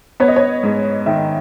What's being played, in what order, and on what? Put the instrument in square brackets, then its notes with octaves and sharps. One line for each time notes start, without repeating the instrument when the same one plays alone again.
[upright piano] B3 [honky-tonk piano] C#5
[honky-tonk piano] D#5
C#5
[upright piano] G#2
[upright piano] D#3 [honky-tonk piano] E5